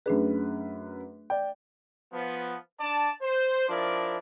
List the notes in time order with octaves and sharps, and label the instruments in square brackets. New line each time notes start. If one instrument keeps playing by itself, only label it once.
[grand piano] F#2 B4 [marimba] A3 D4 G#4
[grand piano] D5 G5
[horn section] F3 B3
D4 D5 A5
C5
F3 D4 E4 A#4 D5